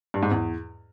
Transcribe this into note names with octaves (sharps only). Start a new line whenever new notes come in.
G2
G#2
E2